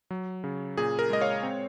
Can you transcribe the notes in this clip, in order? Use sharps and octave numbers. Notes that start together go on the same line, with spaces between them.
F#3
C#3
A#2 G#4
A#4
G#3 D#5
C#5 F5
C4